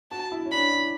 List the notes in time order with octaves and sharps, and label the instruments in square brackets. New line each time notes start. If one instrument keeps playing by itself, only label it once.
[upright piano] F#4 [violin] A5
[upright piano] E4
C#4
[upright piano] D4 [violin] B5
[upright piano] E4